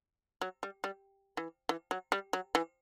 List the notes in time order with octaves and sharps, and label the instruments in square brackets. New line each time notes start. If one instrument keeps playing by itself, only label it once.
[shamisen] F#3
G3
G3
E3
E3
F#3
G3
F#3
E3